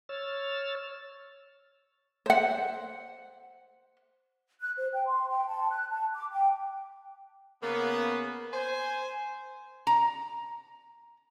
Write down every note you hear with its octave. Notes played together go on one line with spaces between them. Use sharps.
C#5 E6 F6 A6
C5 F#5
F#6
C5
G5
C6
G5
A5
F#6
A5
D6
G5
C#3 A#3 B3
C5 G#5
A#5